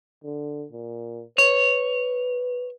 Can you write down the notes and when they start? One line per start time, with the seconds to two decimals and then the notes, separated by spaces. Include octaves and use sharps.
0.24 D3
0.72 A#2
1.38 B4 C#5